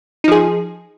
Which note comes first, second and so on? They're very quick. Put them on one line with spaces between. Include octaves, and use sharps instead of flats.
D#4 F3 G#4